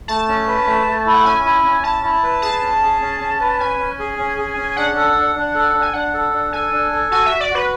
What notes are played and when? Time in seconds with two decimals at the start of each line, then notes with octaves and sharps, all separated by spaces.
0.08 A3 A5
0.28 C#4
0.47 B4
0.67 A3
0.87 A3
1.06 E4
1.13 F#5
1.26 C#4 G#5
1.45 E4
1.64 C#4
1.84 E4 A5
2.03 E4
2.23 B4
2.42 G#4 A5
2.62 C#4
2.82 G#4
3.01 C#4
3.21 C#4
3.40 B4
3.60 C#4 G#5
3.79 C#4
3.99 G#4
4.19 C#4
4.38 G#4
4.57 C#4
4.77 D4 F#5
4.96 A4
5.16 D4
5.36 D4
5.55 A4
5.74 D4
5.82 G#5
5.94 D4 F#5
6.14 A4
6.33 D4
6.53 A4 G#5
6.72 D4
6.91 A4
7.11 F#4 G#5
7.26 F#4 E5
7.41 D5
7.50 F#4 B4